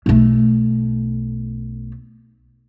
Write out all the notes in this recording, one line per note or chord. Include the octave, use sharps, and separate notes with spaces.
B1 A3